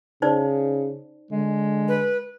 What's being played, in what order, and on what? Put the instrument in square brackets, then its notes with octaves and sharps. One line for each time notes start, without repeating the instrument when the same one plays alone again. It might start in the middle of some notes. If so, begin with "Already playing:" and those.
[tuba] C#3 [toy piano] D#4 C5 D5
[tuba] D3 [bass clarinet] G#3
[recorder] B4